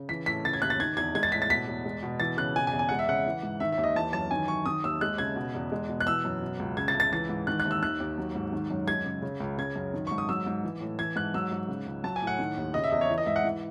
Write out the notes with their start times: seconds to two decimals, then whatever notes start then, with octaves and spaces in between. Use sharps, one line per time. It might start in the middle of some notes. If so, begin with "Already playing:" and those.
Already playing: C#3
0.09 E3 B6
0.26 A2 B6
0.45 C#3 A6
0.53 G#6
0.62 D#2 F#6
0.70 A6
0.80 D#3 G#6
0.97 E2 G#6
1.15 G#3 G#6
1.23 A6
1.32 A2 B6
1.42 A6
1.50 B2 B6
1.67 E2
1.85 G#3
2.03 B2
2.20 E3 A6
2.37 C#3 F#6
2.55 B2 G#5
2.67 G#5
2.73 E2
2.79 G#5
2.89 G#3 F#5
2.99 E5
3.09 C#3 F#5
3.26 E3
3.43 G#2
3.60 D#3 E5
3.72 E5
3.78 D#2
3.84 D#5
3.96 E3 A5
4.13 F#2 A5
4.31 D#3 G#5
4.48 F#2 C#6
4.66 D#3 D#6
4.84 D#2 E6
5.01 G#3 F#6
5.18 C#3 G#6
5.36 B2
5.55 E2
5.72 G#3
5.89 B2
6.00 F#6
6.07 E3 E6
6.25 F#2
6.42 B2
6.59 C#2
6.77 C#3 G#6
6.88 A6
6.94 C#2
7.00 A6
7.12 E3 A6
7.29 G#2
7.47 D#3 F#6
7.60 F#6
7.65 D#2
7.71 E6
7.82 D#3 F#6
8.00 D#2
8.18 F#3
8.35 G#2
8.53 D#3
8.70 F#2
8.87 G#3 G#6
9.05 C#3
9.22 C#3
9.40 C#2
9.58 C#3 G#6
9.76 F#2
9.94 D#3
10.07 G#2 C#6
10.18 D#6
10.29 F#3 E6
10.47 G#2
10.63 E3
10.81 A2
10.99 E3 G#6
11.16 G#2 F#6
11.34 F#3 E6
11.52 G#2
11.68 C#3
11.87 C#2
12.03 F#3 A5
12.16 G#5
12.22 A2
12.27 F#5
12.39 D#3
12.57 D#2
12.74 C#3 D#5
12.84 E5
12.91 E2 D#5
13.01 C#5
13.10 E3
13.18 D#5
13.26 G#2 E5
13.36 F#5
13.44 E3